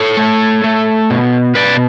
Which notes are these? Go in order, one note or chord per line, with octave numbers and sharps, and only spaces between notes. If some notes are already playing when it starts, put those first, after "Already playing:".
Already playing: A4 C#5
A3
A3
B2
B2 B4 D5